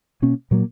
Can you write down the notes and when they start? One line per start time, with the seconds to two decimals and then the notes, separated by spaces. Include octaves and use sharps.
0.22 B2 A#3 C#4
0.51 A#2 F#3 A#3